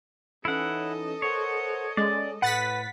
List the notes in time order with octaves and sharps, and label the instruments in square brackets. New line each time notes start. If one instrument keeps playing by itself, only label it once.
[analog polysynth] E3 C#4 D#4 [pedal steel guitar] E4 F#5 [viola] A4 D#5
[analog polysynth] A#4 C5 F#5 [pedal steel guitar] C#5
[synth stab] G#3 [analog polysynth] C#4 [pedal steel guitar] D5
[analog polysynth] A2 [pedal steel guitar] B4 [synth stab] F#5 A6 B6